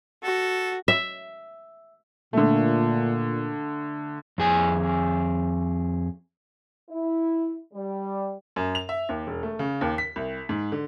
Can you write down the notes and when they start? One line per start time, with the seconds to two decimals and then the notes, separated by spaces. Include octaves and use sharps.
0.23 F#4 A4
0.88 E5
2.33 A#2 D3 A3
4.38 F2 G#4 G#5
6.89 E4
7.74 G3
8.56 F#2
8.75 F7
8.89 E5
9.09 D#2
9.27 E1
9.43 A3
9.59 C#3
9.81 D#2
9.98 B6
10.16 C2
10.49 G#2
10.72 D3